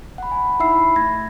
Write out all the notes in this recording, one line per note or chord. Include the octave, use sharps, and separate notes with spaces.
F#5 B5
G#5
D#4 E4 E5 B5 E6 C7
A3 G#6 A#6